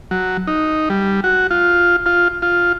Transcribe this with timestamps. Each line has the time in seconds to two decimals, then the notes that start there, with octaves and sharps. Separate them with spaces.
0.11 F#3
0.47 D#4
0.90 G3
1.24 F#4
1.51 F4
2.06 F4
2.42 F4